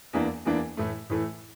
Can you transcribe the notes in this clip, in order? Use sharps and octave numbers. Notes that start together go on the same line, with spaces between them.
E2 E3 A#3 D4
E2 E3 A#3 D4
A2 E3 A3
A2 E3 A3